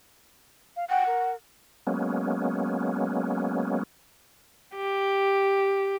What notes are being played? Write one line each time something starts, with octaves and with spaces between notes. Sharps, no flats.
F5
F#5 G5
A#4
F#3 G#3 A#3 B3 C#4
G4